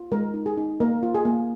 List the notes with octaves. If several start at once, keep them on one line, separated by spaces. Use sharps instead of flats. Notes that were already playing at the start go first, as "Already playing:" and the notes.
Already playing: F4
G#3 A#4
D#4
G#4
D#4
A#3 A#4
F4
G#4
A#3